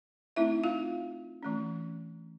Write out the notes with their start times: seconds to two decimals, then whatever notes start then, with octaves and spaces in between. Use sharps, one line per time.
0.36 A3 C4 D#4 E4 E5
0.64 F4 F5
1.43 E3 A3 C#4